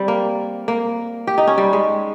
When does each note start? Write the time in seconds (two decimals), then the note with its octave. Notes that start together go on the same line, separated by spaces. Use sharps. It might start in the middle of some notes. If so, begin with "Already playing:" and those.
Already playing: G3 C4
0.08 A#3
0.68 A#3
1.27 G4
1.38 D#4
1.47 C#4
1.58 G3
1.73 G#3